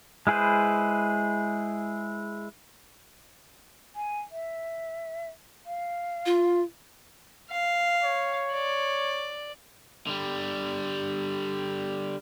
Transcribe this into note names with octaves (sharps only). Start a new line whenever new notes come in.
G#3 E4 G#4 B4 C5
G#5
E5
F5
F4
F5
C#5
D5
D3 G3